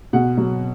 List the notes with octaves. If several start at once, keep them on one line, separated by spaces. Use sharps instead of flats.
B2 F#5
F#3